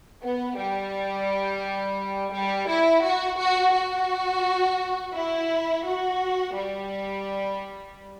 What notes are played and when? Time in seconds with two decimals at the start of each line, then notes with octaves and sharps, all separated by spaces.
0.22 B3
0.57 G3
2.33 G3
2.68 E4
3.03 F#4
3.38 F#4
3.73 F#4
5.14 E4
5.84 F#4
6.53 G3